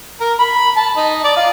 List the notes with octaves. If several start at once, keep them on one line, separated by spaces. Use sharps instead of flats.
A#4
B5
A5
D#4
D5
F4